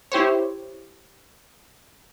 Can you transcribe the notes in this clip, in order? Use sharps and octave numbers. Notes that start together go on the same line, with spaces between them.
E4 G4 C5 C#5